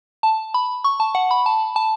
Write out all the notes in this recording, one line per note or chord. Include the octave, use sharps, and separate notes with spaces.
A5
B5
C#6
A5
F#5
B5
A5
A5